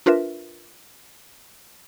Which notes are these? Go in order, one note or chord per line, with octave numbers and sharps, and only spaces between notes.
D4 F4 A#4 B4 E5